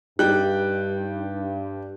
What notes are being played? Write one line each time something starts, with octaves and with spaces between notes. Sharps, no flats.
G2 G3 D#4 G5 F#6